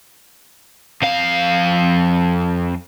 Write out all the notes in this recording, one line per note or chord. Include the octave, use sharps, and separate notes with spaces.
F2 F5